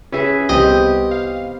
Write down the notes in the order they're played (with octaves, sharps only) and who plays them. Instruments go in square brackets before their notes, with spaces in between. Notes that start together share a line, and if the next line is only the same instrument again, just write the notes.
[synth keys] C#4 E5 [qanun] G#4 B4
[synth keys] C2 [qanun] B3 C4 G4 [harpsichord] D#5
[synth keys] F5